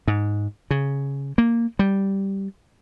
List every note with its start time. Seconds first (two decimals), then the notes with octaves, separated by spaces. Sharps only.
0.08 G#2
0.71 C#3
1.38 A#3
1.79 G3